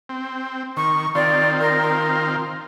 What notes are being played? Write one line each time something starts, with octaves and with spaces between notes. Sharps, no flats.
C4
D#3 C#6
D#3 C4 F4 D5
A#4